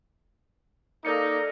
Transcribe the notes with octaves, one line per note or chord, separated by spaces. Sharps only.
A#3 D#4 A4 A#4 D5 C#7